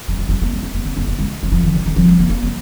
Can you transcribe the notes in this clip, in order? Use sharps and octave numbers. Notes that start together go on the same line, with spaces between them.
F#3
G#3
F#3
A#3
G#3
A#3
A#3
A#3
A#3
A#3
G#3
F#3
F3
D#3
C#3
D#3
F3
G#3
A#3
A#3
F#3